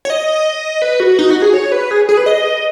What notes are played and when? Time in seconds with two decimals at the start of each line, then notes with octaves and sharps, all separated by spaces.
0.05 C#5
0.10 D#5
0.82 B4
1.00 F#4
1.19 D#4
1.30 F#4
1.42 G#4
1.54 C#5
1.72 B4
1.91 G#4
2.09 G#4
2.17 B4
2.26 D#5